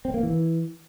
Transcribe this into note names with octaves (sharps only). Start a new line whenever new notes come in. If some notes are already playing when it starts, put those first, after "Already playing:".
C4
A#3
E3